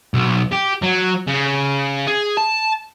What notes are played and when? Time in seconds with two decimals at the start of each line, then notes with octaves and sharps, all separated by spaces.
0.14 B1
0.52 G4
0.82 F#3
1.27 C#3
2.07 G#4
2.37 A5